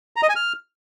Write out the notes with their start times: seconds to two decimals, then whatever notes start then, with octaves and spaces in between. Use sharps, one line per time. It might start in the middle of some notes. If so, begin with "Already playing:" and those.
0.16 A#5
0.23 D#5
0.29 G#5
0.36 F6